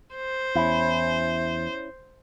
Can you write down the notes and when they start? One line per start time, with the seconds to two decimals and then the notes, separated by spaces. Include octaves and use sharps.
0.15 C5
0.55 E2 C#4 E4